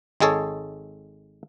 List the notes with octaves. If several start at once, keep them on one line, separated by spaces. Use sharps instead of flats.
G#1 G#3 G#4 A4 C#5